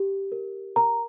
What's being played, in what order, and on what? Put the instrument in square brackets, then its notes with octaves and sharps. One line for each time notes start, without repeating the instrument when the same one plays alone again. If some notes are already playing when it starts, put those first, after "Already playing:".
Already playing: [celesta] G4
A#4
A#4 A#5